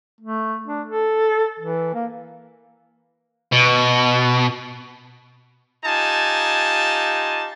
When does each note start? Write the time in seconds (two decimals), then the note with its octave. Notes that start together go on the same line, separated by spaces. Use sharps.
0.21 A3
0.67 D4
0.87 A4
1.60 E3
1.94 A#3
3.53 B2
5.84 D#4 F4 G4 G#5 A5